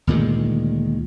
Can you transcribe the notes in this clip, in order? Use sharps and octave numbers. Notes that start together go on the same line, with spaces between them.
D2 A#2 D#3 G#3